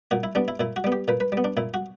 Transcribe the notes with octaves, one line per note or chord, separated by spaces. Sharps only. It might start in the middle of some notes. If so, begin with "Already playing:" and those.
A#2 F#4
E4
G3 B3 D4
E4
A#2 E4
F#4
G3 B3
G4
A#2 B4
B4
G3
B3
D4
A#2 E4
F#4